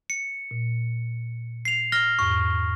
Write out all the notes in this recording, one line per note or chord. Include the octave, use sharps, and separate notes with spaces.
C#7
A#2
C7 F7
F6 A#6 G7
E2 G#2 C#6